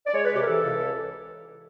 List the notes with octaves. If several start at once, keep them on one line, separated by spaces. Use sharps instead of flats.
D5
G#3 C#5
B4
C3
G4
A#4
E3 A4
C#2